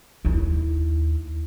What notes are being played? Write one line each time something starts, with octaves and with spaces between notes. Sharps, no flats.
D#2 E4